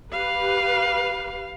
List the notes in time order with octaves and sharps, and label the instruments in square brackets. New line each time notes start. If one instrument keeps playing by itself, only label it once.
[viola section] G4 B4 [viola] F5